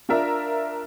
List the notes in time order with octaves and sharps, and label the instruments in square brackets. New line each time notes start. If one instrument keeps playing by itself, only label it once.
[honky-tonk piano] D4 F4 A#4 E5 A#5